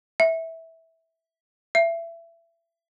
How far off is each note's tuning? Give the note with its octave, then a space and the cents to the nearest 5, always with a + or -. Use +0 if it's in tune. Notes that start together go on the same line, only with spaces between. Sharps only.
E5 -15
E5 +25